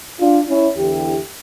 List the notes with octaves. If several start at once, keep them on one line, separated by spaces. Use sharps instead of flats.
D4 F4
C#4 E4
E2 D3 E4 G4